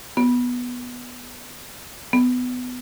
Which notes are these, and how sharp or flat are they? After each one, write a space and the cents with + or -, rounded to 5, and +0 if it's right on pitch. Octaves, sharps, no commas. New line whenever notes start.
B3 -5
B3 +20